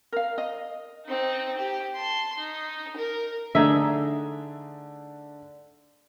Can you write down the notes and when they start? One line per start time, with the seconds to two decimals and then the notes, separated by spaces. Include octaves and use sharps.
0.12 A#4 F5
0.38 D#5
1.06 C4 D#4
1.58 G4
1.96 A5 C6
2.38 D#4
2.97 A#4
3.55 D3 A3 D4 D#4 G#4 E5